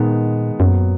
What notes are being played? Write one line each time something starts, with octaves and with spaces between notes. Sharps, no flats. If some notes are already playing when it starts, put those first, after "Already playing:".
Already playing: A#2 D#3 G#3 B3 D#4
F#2 A#2 F#3 B3